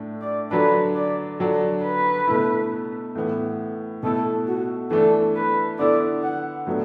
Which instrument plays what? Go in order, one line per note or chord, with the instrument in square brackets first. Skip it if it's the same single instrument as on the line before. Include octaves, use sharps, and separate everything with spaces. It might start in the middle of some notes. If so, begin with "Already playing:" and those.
Already playing: [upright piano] A2 A3 D4
[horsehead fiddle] D5
[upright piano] D3 F#3 D4 [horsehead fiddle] B4
[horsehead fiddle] D5
[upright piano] D3 F#3 D4
[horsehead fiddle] B4
[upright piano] B2 A3 E4
A2 E3 B3
[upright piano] B2 A3 E4 [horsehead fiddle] A4
[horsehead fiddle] F#4
[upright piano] E3 A3 D4 [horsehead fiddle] A4
[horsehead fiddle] B4
[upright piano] D3 B3 E4 [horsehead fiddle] D5
[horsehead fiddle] F#5
[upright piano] A2 F#3 B3 D4